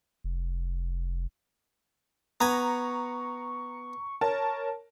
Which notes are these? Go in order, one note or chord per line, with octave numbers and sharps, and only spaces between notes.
F1
B3 G#5 A#5 C#6
A#4 C#5 A5